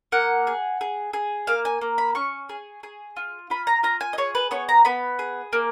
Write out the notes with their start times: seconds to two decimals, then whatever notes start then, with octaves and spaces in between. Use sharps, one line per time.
0.12 A#3 F#5
0.47 G#4
0.81 G#4
1.13 G#4
1.47 A#3 F5
1.65 G#5
1.81 A#3
1.98 B5
2.15 C#4 C#6
2.49 G#4
2.83 G#4
3.17 F4
3.50 F4 B5
3.67 A#5
3.83 F4 A#5
4.01 G#5
4.13 D#5
4.18 G#4 C#5
4.35 B4
4.51 B3 C#5
4.69 A#5
4.85 B3 B5
5.19 G#4
5.53 A#3